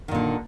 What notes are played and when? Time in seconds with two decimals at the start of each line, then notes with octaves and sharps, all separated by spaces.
0.08 D#3
0.11 A#2
0.15 D3